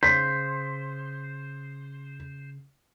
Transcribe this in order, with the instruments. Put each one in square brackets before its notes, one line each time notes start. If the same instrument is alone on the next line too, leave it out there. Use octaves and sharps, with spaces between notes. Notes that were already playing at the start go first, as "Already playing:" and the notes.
[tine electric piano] C#3 [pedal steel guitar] C5 [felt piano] B6